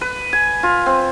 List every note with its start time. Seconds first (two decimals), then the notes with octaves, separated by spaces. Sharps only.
0.01 B4
0.33 G#5
0.63 F4
0.86 C4